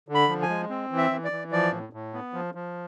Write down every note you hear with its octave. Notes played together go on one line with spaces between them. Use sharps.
D3
B5
F3
G#5
G#3
C4
E3
E5
E3
D5
E3
F3 D5
A2
A2
B3
F3
F3